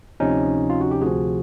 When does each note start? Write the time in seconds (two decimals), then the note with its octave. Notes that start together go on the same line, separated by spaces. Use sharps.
0.20 D2 C3 F3 C#4 D#4
0.70 F4
0.81 F#4
0.91 G4
1.01 D2 C3 F3 F#4 G#4